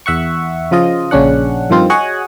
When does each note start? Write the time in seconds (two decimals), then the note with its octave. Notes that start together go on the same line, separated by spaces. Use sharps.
0.06 E2 E5 F#5 C#6
0.71 C#3 F3 F4 D#5
1.11 A#1 C#3 C#4 D4 F#5
1.70 G2 D#3 F3 C4 F4
1.90 F#4 G#4 C#5 D#5 F#5 G#5